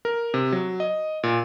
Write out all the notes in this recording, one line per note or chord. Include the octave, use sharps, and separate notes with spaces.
A#4
C3
F#3
D#5
A#2